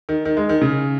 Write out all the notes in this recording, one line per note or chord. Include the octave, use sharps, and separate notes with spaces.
D#3
D#3
G#3
D#3
C#3